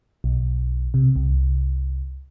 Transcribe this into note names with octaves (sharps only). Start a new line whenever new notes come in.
B1
C3
C2